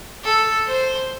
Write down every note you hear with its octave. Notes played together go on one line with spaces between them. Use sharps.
A4
C5